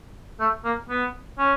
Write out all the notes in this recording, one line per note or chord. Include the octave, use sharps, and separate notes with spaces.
A3
A#3
B3
C#4